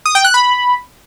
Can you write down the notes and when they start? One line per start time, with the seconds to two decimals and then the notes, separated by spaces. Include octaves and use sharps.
0.06 D#6
0.15 G5
0.25 F#6
0.34 B5